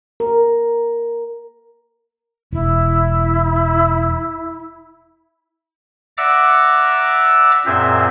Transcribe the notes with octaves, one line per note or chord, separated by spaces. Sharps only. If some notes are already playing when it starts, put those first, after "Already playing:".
A#4
E1 E4
D5 E5 F#5 A#5 D6 E6
F#2 A#2 C4 G#4 C5 E5